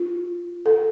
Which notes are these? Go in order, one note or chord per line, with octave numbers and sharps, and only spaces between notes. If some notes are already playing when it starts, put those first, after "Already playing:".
Already playing: F4
A4